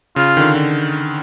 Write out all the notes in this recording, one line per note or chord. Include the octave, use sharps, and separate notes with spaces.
C#3 F4
D#3
D3
D3